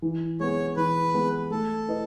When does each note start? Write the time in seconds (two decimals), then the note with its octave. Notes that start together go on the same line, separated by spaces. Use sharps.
0.02 E3
0.40 G#3 B3 C#5
0.76 E3 B4
1.14 G#3 B3
1.51 A3 A4
1.88 E4 B4 D#5